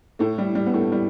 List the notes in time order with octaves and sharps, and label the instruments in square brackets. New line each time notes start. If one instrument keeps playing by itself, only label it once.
[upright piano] A2 A3
G3
G3
B3
A2 A3
G3